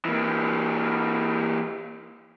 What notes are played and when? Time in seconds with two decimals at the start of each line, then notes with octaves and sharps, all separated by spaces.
0.05 E3 A#3